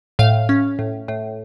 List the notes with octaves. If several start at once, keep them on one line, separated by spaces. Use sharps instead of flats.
A2 F5
C#4
A2
A2